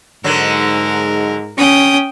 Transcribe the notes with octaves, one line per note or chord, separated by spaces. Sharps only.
G#2 D3 F#3 A#4
C#4 G5 D#6